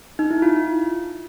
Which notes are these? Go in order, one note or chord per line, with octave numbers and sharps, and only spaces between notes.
D#4
E4
F4